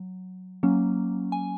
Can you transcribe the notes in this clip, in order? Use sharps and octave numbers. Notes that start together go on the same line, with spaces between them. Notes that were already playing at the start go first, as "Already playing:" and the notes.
Already playing: F#3
F#3 A#3 C#4
G#5